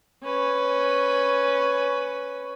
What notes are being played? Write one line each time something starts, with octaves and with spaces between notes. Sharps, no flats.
C#4 B4